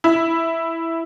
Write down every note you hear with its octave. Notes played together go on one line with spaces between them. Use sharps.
E4